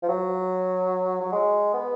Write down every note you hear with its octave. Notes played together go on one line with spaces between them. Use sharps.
F3
F#3
F#3
G#3
B3